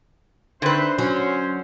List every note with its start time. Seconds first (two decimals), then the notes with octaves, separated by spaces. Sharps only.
0.62 D3 C4 D#4 B4 C5 E5
0.98 F#3 C#4